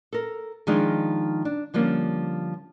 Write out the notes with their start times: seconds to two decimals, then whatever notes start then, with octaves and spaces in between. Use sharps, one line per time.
0.13 A4 A#4
0.67 D#3 F3 G#3 D4 D#4 G#4
1.45 D4
1.74 D3 F3 G3 A#3 C#4